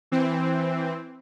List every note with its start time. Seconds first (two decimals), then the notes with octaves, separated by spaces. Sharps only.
0.12 E3 C4